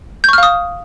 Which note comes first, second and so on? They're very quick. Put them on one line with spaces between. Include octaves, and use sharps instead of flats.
G6 C#6 F6 F5 D#6